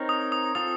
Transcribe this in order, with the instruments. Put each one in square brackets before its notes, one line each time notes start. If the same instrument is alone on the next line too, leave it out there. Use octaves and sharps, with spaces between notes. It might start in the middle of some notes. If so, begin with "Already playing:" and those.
Already playing: [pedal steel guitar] C4 D#4 A#4 C#5
[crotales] D#6
D#6
[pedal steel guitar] C4 F4 A4 [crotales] D#6